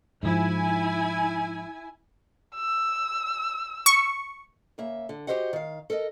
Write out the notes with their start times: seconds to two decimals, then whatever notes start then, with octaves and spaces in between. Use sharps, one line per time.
0.23 G#2 F3 E4 G#5
2.56 E6
3.86 C#6
4.78 C#3 A#3 E5
5.09 D3
5.27 F#4 G4 A4 C5 D#5 F#5
5.53 D#3 F5
5.90 A4 A#4 D5 D#5